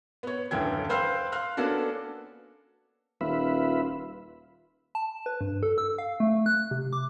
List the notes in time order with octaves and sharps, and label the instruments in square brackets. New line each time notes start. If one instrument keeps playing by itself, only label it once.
[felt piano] B3 C#5
D#1 F#2 D3 E3 G5 G#6
B4 C5 F5 G5 C6 E6
F5 C6 F6 F#6
A#3 B3 C#4 D4 F#4 A4
[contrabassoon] D#1 [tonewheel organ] F4 B4 E5
[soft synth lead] A5
B4
G2
A4
E6
F5
A3
F#6
C3
D6